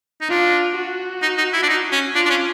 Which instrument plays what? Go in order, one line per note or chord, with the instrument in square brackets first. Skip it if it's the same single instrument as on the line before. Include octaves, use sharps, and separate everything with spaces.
[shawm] D#4
[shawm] D4 [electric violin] F4
[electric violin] F#4
[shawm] D#4
D#4
E4
D4
D#4
C#4
[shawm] D4 [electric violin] F4
[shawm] D4
C#4